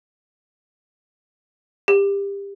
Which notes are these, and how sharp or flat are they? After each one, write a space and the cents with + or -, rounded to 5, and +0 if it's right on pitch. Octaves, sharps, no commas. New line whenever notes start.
G4 +25